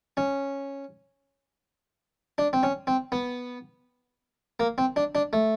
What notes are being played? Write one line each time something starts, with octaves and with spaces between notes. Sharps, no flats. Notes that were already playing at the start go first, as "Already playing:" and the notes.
C#4
D4
C4
C#4
C4
B3
A#3
C4
D4
D4
A3